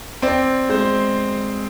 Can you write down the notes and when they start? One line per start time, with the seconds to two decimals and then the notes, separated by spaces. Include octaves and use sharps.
0.22 C4 D5
0.69 G#3 C5